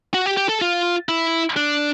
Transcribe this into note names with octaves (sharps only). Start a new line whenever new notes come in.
F#4
G4
G4
A4
F4
E4
D4